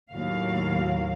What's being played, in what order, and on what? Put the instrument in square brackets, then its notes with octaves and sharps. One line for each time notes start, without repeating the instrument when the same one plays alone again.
[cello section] D#2 A2 F#3 A#3 F#4 F5